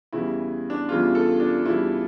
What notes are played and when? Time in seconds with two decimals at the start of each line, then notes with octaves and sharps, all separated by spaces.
0.12 E2 C#3 G3 E4
0.70 D4
0.89 E2 C#3 G3 F4
1.15 A4
1.40 D4
1.65 E2 C#3 G3 E4